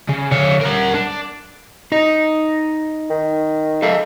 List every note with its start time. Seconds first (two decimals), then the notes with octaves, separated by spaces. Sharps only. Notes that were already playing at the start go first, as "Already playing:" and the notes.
0.09 C#3
0.31 D3 C#5
0.61 A#4 F#5
0.94 D4
1.92 D#4 D#5
3.10 D#3
3.82 G#3 A4 E5 F5